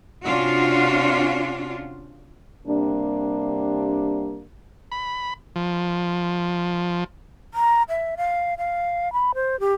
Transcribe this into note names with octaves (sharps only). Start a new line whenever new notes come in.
C3 C#4 D4 F4 F#4
C3 G3 A#3 D4
B5
F3
A#5
E5
F5
F5
B5
C5
G4